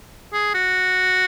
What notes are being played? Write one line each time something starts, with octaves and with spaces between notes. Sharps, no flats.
G#4
F#4